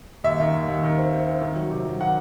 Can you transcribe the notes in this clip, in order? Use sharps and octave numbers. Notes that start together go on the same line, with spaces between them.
D#2 E5
D#3
D#2
D#2
D#3
C4
C4
C4
D#3
F#3
C3
F#3
D#3 F#5